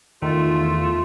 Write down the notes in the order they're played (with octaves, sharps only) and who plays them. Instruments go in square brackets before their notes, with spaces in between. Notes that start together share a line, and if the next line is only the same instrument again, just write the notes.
[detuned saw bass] E2 [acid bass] D#3 [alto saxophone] A3 [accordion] F4